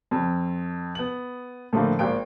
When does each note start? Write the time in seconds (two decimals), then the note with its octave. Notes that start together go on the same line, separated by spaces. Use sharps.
0.11 F2
0.95 B3 F#7
1.73 A2 D3 F3 A3 A#3
1.99 G#1 A#3 G5 D7